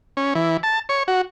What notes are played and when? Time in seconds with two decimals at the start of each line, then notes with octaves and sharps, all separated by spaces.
0.17 C#4
0.35 E3
0.63 A5
0.89 C#5
1.08 F#4